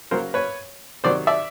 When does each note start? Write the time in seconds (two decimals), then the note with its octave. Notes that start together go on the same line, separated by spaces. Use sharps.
0.11 C#3 F#3 A#3 A#4 C5
0.34 B4 C#5
1.04 C3 D#3 F#3 C5 D5
1.27 D5 E5